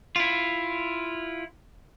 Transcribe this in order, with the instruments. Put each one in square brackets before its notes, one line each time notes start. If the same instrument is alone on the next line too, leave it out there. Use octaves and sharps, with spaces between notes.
[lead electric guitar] E4 F4